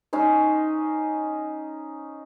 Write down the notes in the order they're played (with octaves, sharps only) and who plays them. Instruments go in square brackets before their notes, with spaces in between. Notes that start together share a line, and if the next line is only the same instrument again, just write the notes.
[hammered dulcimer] C#4 D#4 C5